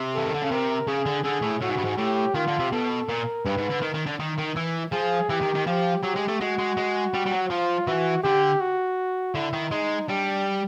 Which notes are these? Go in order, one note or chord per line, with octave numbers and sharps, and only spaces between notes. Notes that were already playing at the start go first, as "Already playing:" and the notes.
Already playing: C3
E3 A4
D#3
D3
C#3
C3 A#4
C#3 G#4
D3
D3 G#4
A2
A2 F#4
G#2
G2
G#2
A2 G4
D#3 F4
D3
C3
B2 A4
A#2 A#4
G2 B4
G#2
D3
D#3
D#3
D3
D#3
D#3
E3
F3 G#4
E3 G4
D#3
D#3
F3 G4
F#3 G4
G#3
A3
G#3 F#4
G#3
G#3
G3
G3
F#3
F3 F4
E3 F#4
D3 G4
F#4
D3 E4
D#3
G#3 D#4
G3 D4